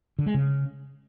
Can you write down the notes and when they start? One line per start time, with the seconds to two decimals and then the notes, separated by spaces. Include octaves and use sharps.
0.19 D3
0.26 G#3
0.34 C#3